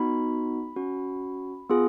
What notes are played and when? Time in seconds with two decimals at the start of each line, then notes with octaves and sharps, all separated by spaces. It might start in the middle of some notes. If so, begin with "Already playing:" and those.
Already playing: B3 D#4 F#4 B5
0.76 C#4 F#4
1.70 B3 F4 G#4